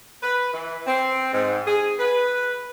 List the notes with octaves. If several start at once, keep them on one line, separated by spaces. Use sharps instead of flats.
B4
E3
C4
G#2
G#4
B4